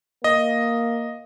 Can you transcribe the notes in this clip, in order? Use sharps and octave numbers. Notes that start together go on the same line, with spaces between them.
A#3 D#5